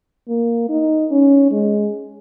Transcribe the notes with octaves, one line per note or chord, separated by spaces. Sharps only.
A#3
D#4
C#4
G#3